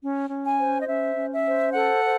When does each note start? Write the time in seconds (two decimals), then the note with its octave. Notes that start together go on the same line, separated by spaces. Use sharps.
0.02 C#4
0.30 C#4
0.45 G#5
0.59 C5
0.79 D#5
0.87 C#4 E5
1.16 C#4
1.31 E5
1.46 C5
1.74 A4 F#5
2.03 C5